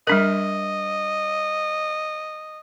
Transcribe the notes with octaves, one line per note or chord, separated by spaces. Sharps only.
G3 D4 A#4 D#5